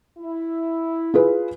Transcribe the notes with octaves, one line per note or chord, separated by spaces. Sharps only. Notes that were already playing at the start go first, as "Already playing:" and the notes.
E4
F4 G#4 B4